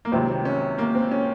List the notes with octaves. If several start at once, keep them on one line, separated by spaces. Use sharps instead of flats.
A#3
C#2 C3 D#3 F#3 C4
C#4
A#3
C4
C#4